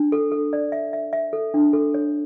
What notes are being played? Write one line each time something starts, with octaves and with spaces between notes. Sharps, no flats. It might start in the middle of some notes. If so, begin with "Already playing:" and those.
Already playing: D4
A4
A4
D5
E5
E5
E5
A4
D4
A4
C#5